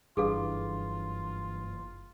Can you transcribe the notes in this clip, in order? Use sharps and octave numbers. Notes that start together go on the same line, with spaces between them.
F#1 G2 E3 F4 G#4 A4 F5